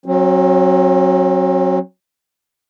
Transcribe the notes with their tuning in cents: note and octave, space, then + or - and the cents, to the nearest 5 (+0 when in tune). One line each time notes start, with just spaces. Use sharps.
F#3 +0 C4 +45